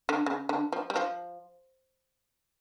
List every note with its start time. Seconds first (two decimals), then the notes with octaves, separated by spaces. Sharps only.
0.09 D3
0.26 C#3
0.49 D3
0.72 F3
0.90 G3
0.96 F3